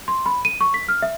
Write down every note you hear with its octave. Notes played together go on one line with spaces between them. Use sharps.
C6
B5
D#7
C#6
B6
F6
E5